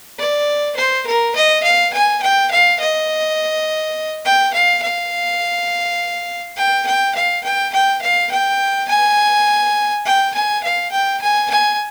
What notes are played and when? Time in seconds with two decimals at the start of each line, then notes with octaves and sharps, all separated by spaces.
0.19 D5
0.77 C5
1.07 A#4
1.36 D#5
1.64 F5
1.93 G#5
2.22 G5
2.51 F5
2.80 D#5
4.25 G5
4.53 F5
4.82 F5
6.56 G5
6.87 G5
7.15 F5
7.44 G5
7.73 G5
8.02 F5
8.31 G5
8.88 G#5
10.06 G5
10.34 G#5
10.64 F5
10.92 G5
11.21 G#5
11.50 G#5